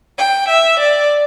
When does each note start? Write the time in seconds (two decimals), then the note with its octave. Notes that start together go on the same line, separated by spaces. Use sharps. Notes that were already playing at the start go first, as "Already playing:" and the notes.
0.18 G5
0.49 E5
0.80 D5